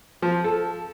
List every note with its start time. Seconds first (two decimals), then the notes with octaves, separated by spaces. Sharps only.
0.22 F3
0.44 A4